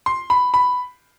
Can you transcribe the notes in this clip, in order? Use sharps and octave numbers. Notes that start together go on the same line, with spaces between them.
C6
B5
B5